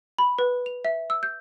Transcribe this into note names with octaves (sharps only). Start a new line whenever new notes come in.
B5
B4
F7
E5
E6
G6